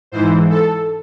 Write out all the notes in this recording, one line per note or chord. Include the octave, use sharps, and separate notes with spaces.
G#2 E3 C5
A4